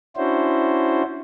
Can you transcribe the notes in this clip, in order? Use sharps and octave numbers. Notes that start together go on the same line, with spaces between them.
C#4 D4 E4 F#4 C5